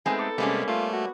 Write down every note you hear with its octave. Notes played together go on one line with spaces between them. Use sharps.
G#3 A3 B3 C4 D#4 A4 G#5
A4 D6
C3 G3 G#3 A#3 C#4
A3 F4
F#4